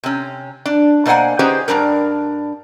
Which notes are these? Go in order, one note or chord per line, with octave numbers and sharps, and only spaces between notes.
C3 C#4
D4
B2 A#3 C5 D5 F#5 G#5
C#4 D#4 G4 G#4 B4 C5
G2 C#3 G3 D4 A#4